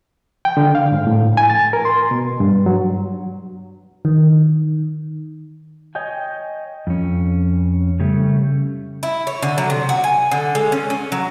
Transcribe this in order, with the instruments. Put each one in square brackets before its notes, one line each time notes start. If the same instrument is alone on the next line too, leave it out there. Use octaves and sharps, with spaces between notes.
[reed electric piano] G5
D3
F5
G#2
A2
G#5
A6
A#4
C6
B2
G2
F#3
[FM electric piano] D#3
[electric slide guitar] C#5 D#5 G5 G#5
F2 C#4
C#3 G3 A3
[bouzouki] E4
C#5
D3
F#3
C3
F#4
G#5
D3
G#3
C#4
C#4
F#3